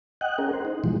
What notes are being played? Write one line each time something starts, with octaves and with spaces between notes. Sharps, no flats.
D#5 F#5 G5 F#6
C#4 G#4 A#4
C5
D#4
B2 E3 F3 G3 G#3